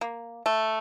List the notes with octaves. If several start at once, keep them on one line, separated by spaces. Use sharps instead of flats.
A#3
A3